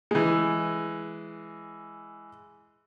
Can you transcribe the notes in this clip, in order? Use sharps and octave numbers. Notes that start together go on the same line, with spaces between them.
E3 G#3